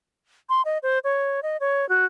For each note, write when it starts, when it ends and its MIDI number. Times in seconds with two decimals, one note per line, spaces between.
0.49 0.62 84
0.65 0.78 75
0.83 0.99 72
1.04 1.40 73
1.43 1.57 75
1.60 1.88 73
1.89 2.06 66